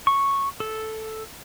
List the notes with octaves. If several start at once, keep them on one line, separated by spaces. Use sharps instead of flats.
C#6
A4